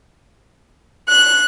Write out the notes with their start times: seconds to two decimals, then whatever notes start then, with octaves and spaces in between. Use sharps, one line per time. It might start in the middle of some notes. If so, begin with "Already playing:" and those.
1.08 F#6